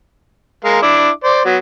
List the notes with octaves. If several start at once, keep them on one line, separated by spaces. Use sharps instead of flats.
G#3 A#4 F5
D4 E4 D6
C5 D5
F#3 B3